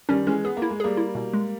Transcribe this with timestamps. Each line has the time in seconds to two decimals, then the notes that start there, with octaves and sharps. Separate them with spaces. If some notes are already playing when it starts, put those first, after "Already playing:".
0.09 D#3 G3 C#4
0.26 E3 G#3 C#4
0.45 B3 G#4
0.57 A#3
0.62 E4
0.70 G#3
0.80 G3 A#3 G#4
0.97 E4
1.15 B2
1.33 G#3